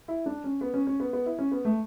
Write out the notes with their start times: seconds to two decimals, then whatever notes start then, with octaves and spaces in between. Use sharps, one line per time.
0.08 E4
0.26 D4
0.44 C#4
0.61 B3
0.74 C#4
0.87 C#4
1.00 B3
1.13 B3
1.26 E4
1.39 C#4
1.52 B3
1.65 A3